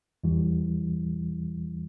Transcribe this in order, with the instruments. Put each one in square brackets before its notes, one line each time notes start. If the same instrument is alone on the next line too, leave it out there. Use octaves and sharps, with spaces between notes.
[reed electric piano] E2 E3 G3